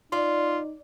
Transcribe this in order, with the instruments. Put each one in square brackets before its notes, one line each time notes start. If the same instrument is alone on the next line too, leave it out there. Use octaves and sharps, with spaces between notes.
[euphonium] D#4 [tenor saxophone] F4 [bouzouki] D5